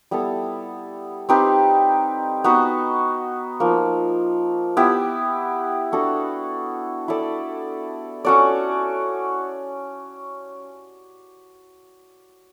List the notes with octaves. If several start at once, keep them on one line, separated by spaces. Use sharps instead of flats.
G3 B3 E4 A4
C4 D#4 G4 B4
B3 D#4 F#4 B4
F3 A#3 D#4
B3 E4 G4
D4 F#4 A4
E4 A4 D5
C#4 F#4 A4 D5